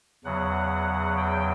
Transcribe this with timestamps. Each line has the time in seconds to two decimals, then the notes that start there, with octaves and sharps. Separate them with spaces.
0.24 E2 C#3 F#3 F#5
1.17 G5